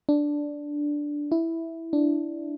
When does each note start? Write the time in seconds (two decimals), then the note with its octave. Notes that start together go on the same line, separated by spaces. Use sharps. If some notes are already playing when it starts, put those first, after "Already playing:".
0.09 D4
1.32 E4
1.93 D4